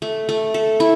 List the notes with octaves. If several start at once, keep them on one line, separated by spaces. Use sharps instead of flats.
A3
A3
A4
E4